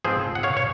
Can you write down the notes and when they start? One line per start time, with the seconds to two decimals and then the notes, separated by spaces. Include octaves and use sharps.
0.05 G#2 F3 G#3 C4 G#4 C5
0.35 F#5
0.43 C#5 F5
0.57 C#5